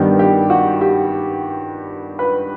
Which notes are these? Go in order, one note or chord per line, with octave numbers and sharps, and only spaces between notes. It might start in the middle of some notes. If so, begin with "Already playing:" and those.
Already playing: G2 D#3 G3 B3
G4
F#4
G4
B4